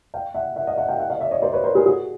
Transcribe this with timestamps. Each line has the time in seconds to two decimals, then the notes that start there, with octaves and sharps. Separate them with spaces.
0.14 F5 G5
0.34 E5 F#5
0.56 E5 F#5
0.67 D#5 F5
0.78 E5 F#5
0.88 F5 G5
0.99 E5 F#5
1.10 D#5 F5
1.21 D5 E5
1.31 C#5 D#5
1.42 C5 D5
1.52 B4 C#5
1.64 A#4 C5
1.75 G#4 A#4
1.86 F#4 G#4